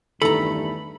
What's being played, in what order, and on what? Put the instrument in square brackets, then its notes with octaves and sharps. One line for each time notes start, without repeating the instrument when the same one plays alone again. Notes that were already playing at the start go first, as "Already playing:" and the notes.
[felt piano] E2 D#3 A3 [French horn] G2 [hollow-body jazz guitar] A4 A#5 [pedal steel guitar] B5